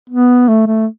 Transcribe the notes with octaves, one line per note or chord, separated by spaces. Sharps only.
B3
A3
A3